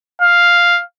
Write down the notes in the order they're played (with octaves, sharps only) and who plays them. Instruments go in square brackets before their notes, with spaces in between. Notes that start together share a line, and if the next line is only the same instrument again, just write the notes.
[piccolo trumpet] F5